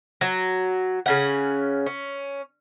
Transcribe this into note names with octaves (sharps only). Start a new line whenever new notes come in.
F#3
C#3 C#4 F#5
C#4